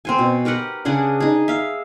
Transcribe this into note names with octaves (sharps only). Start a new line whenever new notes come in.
C4 C5 G#5
B2
G4 A#4 B4 F#5
C#3 D4 G#4 F#5
D#4 G#4
E5 F5